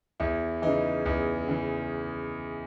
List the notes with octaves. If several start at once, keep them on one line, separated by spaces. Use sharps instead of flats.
E2 E4
C#3 E3 D#4
E2 E4
C#3 E3